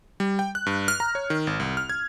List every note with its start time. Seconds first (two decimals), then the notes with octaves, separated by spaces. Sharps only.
0.20 G3
0.39 G5
0.55 F#6
0.66 G2
0.88 F6
1.00 A#5
1.15 C#5
1.30 D#3
1.47 G#1
1.60 C2
1.77 F6
1.89 G#6